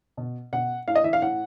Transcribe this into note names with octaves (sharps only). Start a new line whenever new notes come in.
B2
B2 F#5
A2 F5
D#5
E3 E5
F5
A2 F#5